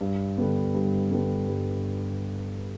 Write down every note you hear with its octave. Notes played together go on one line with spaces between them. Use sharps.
G2
D3 G3 B3
G2
D3 G3 B3
G2